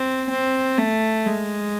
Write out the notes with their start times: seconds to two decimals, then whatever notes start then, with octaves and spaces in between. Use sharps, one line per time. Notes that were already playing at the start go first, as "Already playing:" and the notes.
Already playing: C4
0.30 C4
0.78 A3
1.26 G#3